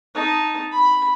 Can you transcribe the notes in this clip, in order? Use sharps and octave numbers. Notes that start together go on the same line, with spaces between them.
D#4 A5
B5